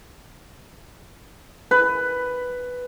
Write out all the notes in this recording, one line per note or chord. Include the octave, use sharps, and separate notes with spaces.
B4